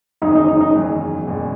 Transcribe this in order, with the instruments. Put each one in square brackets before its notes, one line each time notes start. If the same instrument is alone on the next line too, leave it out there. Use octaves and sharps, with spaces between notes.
[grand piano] F#1 E2 D#3 F#3 [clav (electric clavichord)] D#4
[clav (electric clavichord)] D#4
D#4
D#4
[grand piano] F#1 E2 D#3 F#3
F#1 E2 B2 G#3